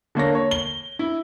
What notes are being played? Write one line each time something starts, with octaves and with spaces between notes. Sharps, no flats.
D3 A#3 C#5 A#6
C#5
G7
E4